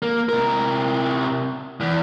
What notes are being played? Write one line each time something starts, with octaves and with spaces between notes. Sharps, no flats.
A#3
C3 A#4
E2